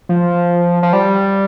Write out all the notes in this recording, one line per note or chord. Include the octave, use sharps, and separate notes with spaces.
F3
F3
G3